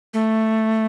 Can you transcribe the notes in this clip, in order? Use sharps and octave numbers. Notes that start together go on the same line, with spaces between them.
A3